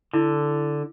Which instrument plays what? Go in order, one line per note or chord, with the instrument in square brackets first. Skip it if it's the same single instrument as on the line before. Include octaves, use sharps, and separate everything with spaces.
[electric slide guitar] D3 [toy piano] E4